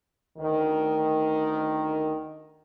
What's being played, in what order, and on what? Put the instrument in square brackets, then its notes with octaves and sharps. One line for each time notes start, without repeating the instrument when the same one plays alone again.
[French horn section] D2 D#3